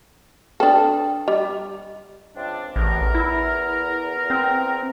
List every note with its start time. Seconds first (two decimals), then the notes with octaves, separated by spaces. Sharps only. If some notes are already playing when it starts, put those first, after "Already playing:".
0.60 D4 A4 B4 G5 D#6
1.28 G3 D#5
2.36 C#2 C4 D4
2.76 A1 E2 A#4
3.15 E4
4.30 C4